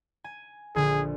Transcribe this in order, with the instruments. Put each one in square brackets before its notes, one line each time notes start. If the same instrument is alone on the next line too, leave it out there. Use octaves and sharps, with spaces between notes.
[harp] G#5
[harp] A#1 D3 [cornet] G#4